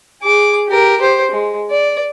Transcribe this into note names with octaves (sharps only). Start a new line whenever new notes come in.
G#4 D6
G4 A#4
G4 C5
G#3
D5